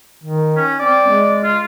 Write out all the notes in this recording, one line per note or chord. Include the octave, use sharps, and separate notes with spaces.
D#3
C#4
C4 D5
G#3
F4